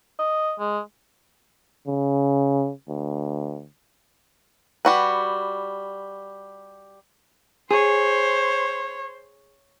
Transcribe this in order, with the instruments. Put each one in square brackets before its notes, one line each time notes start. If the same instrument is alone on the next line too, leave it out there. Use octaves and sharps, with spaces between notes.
[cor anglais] D#5
G#3
[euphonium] C#3
D2
[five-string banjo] G3 F#4 B4
[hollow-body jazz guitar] G#4 [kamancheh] C5 [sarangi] C#5